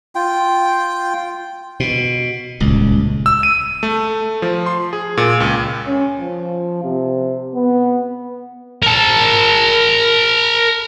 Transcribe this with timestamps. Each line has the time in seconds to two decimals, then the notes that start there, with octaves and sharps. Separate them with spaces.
0.15 F4 G5
1.80 B2
2.60 D#1 C#2
3.26 E6
3.43 D#7
3.83 A3
4.42 F3
4.66 C6
4.93 G#4
5.17 A#2
5.40 C#2
5.87 C#4
6.20 F3
6.83 C3
7.54 B3
8.83 A#4 A5